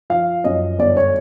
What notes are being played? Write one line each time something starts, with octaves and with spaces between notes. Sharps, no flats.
F3 F5
F#2 D#5
G1 D5
C#5